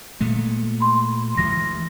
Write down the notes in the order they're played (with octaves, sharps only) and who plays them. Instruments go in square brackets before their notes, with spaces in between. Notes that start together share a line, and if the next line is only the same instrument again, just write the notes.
[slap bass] A#2 G#3 A3
[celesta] B5 C6
[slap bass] D2 E3 G#3 [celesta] A#6